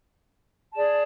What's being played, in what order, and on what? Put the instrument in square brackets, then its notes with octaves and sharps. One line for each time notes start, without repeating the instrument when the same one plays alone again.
[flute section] G#4 D5 A5